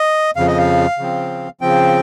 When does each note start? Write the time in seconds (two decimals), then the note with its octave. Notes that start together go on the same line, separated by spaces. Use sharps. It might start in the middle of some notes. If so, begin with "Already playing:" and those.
Already playing: D#5
0.36 F2 C#3 F3 F5
0.47 D#5
0.58 F5
0.98 C#3 F3 C4
1.61 C#3 F3 C4 G5